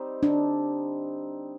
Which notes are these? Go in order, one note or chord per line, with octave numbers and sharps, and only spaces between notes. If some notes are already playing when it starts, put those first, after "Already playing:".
Already playing: G3 C4 D#4
D4